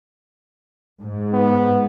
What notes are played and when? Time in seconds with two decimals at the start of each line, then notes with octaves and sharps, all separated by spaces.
1.00 G#2
1.33 B3